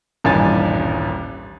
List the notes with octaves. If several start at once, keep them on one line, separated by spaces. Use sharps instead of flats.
D#1 A1 G2 G#5 A6